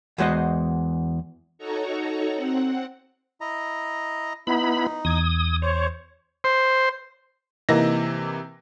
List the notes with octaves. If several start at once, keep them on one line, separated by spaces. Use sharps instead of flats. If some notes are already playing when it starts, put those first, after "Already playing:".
E2 G#3 F#4 C5 D#5
D#4 F#4 A4 C#5 A#5 C#6
C4 F#5
E4 D#5 A#5
B3 D#4 E4 B5
E2 D#6 G#6
C5 C#5
C5
C3 E3 A#3 D#4 A#6